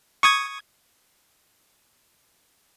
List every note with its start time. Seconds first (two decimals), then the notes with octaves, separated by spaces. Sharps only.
0.23 C#6 D#6 G#6